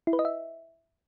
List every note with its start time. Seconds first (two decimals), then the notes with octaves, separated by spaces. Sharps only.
0.07 E4
0.13 B4
0.19 D#5
0.25 E5